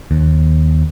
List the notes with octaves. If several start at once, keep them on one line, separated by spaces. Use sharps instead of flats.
D#2